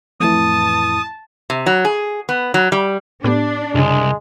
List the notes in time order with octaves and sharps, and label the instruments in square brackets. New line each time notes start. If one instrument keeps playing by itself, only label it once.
[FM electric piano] F2 A2 E3 [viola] A5 [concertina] D#6
[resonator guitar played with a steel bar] C3
F#3
G#4
B3
F#3
G3
[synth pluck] A2 B3 G4 [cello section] D4
[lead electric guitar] C2 [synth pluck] F#2 C#3 [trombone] G#3